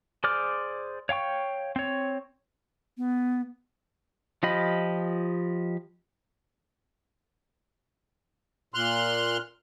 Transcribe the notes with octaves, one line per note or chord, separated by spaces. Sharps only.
G#4 C5 D5 D6 F6
C#5 F5 G5 C#6
C4 C#5
B3
F3 F4 G4 D#5 B5
A#2 C6 F6 F#6